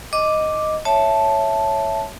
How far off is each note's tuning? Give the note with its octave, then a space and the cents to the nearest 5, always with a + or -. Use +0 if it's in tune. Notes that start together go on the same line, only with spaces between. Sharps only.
D#5 +0 D6 +0
C#5 +0 E5 +0 A5 -5